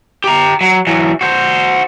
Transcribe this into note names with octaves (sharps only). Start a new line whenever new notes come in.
G4 A#5
F#3
E3 F#3
F#4 C5